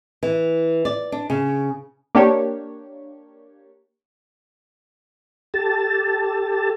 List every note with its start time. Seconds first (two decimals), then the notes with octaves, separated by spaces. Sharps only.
0.23 E3
0.85 D5
1.12 D4
1.30 C#3
2.15 A#3 D4 G4 C#5
5.54 G4 A4 A5